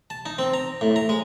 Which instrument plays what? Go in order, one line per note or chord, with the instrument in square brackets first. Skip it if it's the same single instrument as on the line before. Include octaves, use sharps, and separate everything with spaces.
[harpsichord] A5
D#4
C4
A#5
A2
A#5
G#3